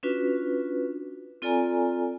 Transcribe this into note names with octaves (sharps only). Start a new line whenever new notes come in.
C#4 D4 F4 F#4 B4
C4 F4 A4 D5 G#5 A#5